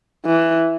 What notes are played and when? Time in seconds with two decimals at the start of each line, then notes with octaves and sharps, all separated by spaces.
0.26 E3